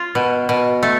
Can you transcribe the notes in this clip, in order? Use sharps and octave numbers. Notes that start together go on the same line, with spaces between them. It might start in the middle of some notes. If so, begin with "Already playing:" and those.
Already playing: F4
B2
B2
A3